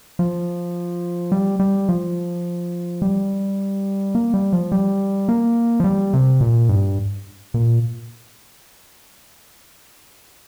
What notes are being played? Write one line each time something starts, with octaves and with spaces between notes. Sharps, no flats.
F3
G3
G3
F3
G3
A#3
G3
F3
G3
A#3
F3
G3
C3
A#2
G2
A#2